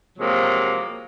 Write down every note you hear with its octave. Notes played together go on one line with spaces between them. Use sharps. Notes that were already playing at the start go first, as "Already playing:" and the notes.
C3 F3 F#3 G#3 A#3